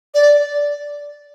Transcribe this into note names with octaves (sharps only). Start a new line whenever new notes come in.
D5